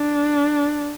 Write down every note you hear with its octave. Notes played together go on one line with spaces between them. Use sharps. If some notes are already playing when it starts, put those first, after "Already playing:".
Already playing: D4